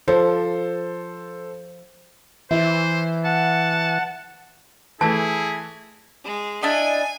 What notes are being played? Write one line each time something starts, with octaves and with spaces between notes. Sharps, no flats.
F3 A4 C5
E3 E4 C5
F#5 A5
E3 A3 E4 G#4 A5
G#3
D4 E4 D#5 G#5